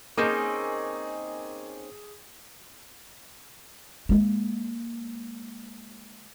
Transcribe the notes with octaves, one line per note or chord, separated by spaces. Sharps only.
A#3 C4 C#4 D#4 G#4 G#5 D6
G#3 A#3